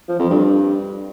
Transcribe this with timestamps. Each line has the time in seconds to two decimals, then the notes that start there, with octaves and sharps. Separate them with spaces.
0.09 F3
0.19 F2
0.30 G2